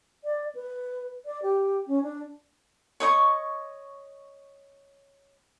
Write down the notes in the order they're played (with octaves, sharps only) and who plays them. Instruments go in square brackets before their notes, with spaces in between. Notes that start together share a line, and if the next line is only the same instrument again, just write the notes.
[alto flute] D5
B4
D5
G4
C#4
D4
[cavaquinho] C#5 D#5 C#6